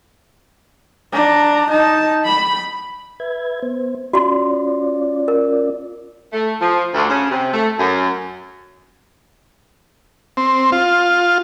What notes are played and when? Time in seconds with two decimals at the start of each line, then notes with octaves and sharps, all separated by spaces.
1.12 D4 A#5
1.70 D#4 A5
2.25 B5
3.20 B4 E5 G#6
3.62 B3 C5
4.13 C#4 F4 F#4 D5 C6
5.28 A#4
6.33 A3
6.61 F3
6.94 D2
7.10 C#3
7.31 C3
7.53 A3
7.79 F#2
10.37 C4
10.72 F4